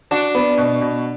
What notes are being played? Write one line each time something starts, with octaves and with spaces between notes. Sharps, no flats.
D4 F#4
B3
B2
B2